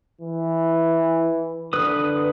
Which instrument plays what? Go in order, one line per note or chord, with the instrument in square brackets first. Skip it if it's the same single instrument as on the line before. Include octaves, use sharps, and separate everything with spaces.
[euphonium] E3
[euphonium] D3 [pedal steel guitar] B4 D#6